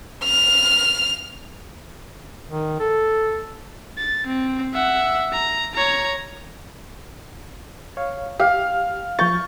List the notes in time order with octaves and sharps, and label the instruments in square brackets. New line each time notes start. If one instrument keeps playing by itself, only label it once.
[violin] F6
[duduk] D#3
A4
[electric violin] A6
C4
E5 F#5
A#5
C#5 A#5
[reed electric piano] C#5 F5
[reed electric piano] G4 [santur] F5
[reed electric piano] F3 G6 A6 [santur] C#6